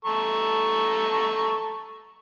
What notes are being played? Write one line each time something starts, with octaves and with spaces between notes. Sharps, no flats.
A4 A#5 C#6